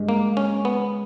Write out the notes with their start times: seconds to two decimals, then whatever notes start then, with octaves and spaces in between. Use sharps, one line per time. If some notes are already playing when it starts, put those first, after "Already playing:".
Already playing: G2 G#3
0.09 A#3
0.37 C#4
0.65 B3